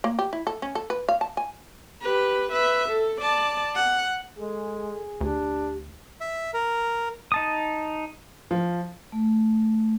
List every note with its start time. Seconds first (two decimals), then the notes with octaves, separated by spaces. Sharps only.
0.04 A#3
0.19 G4
0.33 E4
0.47 A4
0.62 C#4
0.75 A4
0.90 B4
1.08 F5
1.21 A5
1.37 G#5
2.02 G4 B4
2.52 B4 E5
2.88 A4
3.21 D5 A5
3.75 F#5
4.38 G#3 G#4 A4
5.21 D2 D4 G4
6.21 E5
6.54 A#4
7.32 D#4 A5 D#6
8.51 F3
9.12 A3